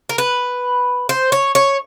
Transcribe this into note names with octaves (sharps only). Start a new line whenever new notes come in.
A#4
B4
C5
C#5
C#5